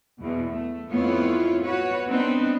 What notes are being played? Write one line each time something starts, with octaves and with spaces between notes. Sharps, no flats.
E2 B2
A3
F2 A3 B3 E4 F4 C#5
F#4 B4 C#5
B3 C4 D4 D#4 B4